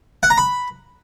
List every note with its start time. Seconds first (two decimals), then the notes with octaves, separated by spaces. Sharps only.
0.23 F#5
0.30 A#5
0.38 B5